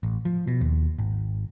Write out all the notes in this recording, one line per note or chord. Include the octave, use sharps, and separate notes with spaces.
A1
F3
B2
D#2
G#1